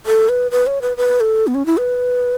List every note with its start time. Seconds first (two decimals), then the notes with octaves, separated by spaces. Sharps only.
0.06 A4
0.29 B4
0.51 B4
0.67 C#5
0.82 B4
0.97 B4
1.20 A4
1.47 B3
1.55 C#4
1.66 E4
1.77 B4